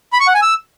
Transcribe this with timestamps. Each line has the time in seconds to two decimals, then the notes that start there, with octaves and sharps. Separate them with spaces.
0.13 B5
0.20 C#6
0.27 F#5
0.35 G#5
0.42 E6